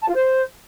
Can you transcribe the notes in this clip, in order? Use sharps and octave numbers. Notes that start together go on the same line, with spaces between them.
A5
F4
C5